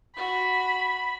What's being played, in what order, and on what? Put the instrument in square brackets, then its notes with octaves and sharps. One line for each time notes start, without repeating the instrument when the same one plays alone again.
[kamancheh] F#4 [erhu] B5